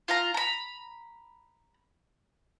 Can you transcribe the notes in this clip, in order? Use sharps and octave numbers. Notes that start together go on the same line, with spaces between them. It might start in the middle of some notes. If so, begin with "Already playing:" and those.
F4 F5 A#5
A#5 B5